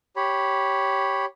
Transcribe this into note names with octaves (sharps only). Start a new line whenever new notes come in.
G4 C#5 B5